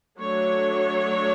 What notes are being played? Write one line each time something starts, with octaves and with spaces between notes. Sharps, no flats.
F#3 A3 D4 C#5